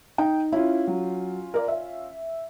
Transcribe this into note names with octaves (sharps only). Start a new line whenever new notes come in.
D#4 G5
C#4 E4 F4
F#3
A#4 D5
E5